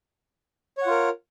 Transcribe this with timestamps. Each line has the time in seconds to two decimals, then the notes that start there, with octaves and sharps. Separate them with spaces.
0.78 C#5
0.82 F#5
0.86 F4
0.91 A#4